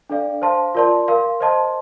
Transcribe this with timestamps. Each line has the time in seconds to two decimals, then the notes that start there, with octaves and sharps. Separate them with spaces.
0.09 D4 A4 D5 F5
0.42 C5 F5 A5 C6
0.75 F4 A#4 D5 A5 C6
1.08 A#4 F5 C6
1.40 C5 D#5 A5 C6